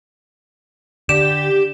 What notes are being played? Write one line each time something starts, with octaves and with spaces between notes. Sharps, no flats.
D3 G4 D5 E7